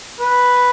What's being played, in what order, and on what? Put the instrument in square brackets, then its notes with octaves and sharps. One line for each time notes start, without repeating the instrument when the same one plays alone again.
[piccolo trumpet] B4